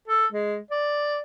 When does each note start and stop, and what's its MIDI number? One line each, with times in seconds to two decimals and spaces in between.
0.08 0.26 69
0.32 0.57 56
0.71 1.22 74